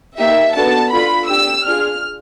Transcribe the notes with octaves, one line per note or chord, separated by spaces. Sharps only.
A#3 D#4 G4 E5
B3 D4 F#4 A4 A5
D4 F4 A4 B5
D4 G4 E6
D4 F4 G#4 F6